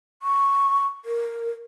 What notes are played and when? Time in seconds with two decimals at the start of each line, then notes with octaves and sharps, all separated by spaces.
0.22 C#6
1.05 A#4